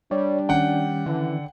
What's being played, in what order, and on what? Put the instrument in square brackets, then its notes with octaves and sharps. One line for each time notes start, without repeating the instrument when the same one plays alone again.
[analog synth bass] G3 [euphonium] D4 [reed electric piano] C#5 D5
[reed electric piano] D#3 C#4 [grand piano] F#5 G5
[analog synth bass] D3 [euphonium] E3